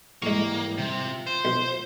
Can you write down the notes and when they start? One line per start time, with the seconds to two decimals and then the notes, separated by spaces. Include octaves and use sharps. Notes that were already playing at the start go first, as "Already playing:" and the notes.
0.22 G#2 E3 G3 G#3 A#3 C#6
0.78 C3
1.04 F4
1.27 C5
1.45 B1